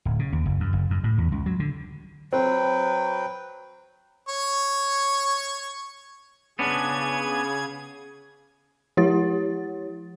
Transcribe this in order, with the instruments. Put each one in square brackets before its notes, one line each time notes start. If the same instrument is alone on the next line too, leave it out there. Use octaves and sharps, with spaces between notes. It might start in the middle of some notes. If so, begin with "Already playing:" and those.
[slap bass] D1
C#3
D#2
F#1
F#2
F#1
F#2
A2
E2
C#2
F#3
D3
[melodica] F#3 B4 G5 [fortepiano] C4
[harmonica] C#5 C#6
[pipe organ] C#3 G#4 G#6 [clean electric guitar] B3 C#4 D4
[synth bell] F3 E4 G4 C#5 F#5 A6